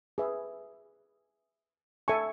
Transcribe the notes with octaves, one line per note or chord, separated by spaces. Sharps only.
G#4 B4 E5
A4 E5 G#5 C#6